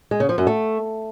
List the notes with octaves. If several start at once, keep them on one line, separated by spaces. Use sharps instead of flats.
G#3
C#3
F3
F#2
A3